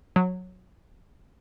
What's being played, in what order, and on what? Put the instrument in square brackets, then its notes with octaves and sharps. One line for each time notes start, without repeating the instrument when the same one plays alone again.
[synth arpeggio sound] F#3